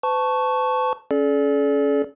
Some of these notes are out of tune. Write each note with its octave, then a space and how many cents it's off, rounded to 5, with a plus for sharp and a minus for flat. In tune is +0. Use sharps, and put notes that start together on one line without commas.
B4 +45 A5 +0 C#6 +0
C#4 +10 A4 -40 D5 -15